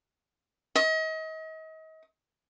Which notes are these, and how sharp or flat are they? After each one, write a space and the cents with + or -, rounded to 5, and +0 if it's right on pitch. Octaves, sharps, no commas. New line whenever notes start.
D#5 +35